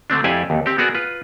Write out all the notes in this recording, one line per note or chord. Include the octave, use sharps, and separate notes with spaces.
D3 A3 C4 D4
F2 E4 G4 C5 D5 G#5
D#2
C4 G4
B3 F#4 G#4 A#4 D5
F4 B4